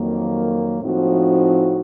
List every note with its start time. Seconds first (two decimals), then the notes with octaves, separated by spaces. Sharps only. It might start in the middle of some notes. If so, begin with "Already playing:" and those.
Already playing: F2 D#3 F#3 A#3
0.82 A2 F3 C4 D#4 F#4